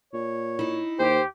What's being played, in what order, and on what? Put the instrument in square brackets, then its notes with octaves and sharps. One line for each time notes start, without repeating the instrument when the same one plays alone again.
[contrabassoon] A#2 [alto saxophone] C#5
[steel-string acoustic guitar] D#4 E4
[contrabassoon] D#2 [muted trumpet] G4 [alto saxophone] C5